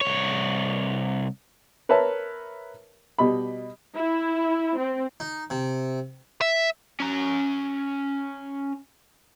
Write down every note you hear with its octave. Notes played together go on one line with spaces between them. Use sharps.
C2 C#5
A#4 B4 C#5 E5 A5
B2 G3 D#5 B5
E4
C4
D#4
C3
E5
C#4 A#5